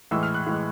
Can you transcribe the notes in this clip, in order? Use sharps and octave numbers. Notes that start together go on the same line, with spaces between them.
A2 E3 G#3 E6
F6
F#6
A2 E3 G#3